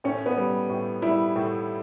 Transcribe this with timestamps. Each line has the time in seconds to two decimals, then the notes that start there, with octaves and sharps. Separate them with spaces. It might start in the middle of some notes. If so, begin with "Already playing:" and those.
0.04 A2 C#4
0.26 B3
0.37 G3
0.70 A2
1.02 G3 E4
1.36 A2